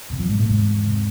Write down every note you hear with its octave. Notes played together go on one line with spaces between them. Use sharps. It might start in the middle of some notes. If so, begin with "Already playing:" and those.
E2 C3
F2 F3
G#2 G#3
A2 A3
E2 G#2 C3 G#3
C3